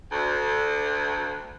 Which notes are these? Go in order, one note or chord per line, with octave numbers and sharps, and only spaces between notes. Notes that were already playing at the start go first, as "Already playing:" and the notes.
D2